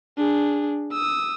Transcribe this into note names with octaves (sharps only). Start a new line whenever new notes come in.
D4 G#4
D#6 E6